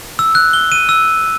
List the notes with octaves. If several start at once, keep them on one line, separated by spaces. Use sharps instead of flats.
E6
F#6
G7
D#7
E6